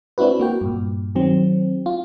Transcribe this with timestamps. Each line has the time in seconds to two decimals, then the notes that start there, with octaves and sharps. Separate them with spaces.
0.18 C4 D4 E4 F#4 B4
0.40 A#3 F#4 G5
0.61 G2 A#2
1.15 D#3 F#3 C4
1.86 F4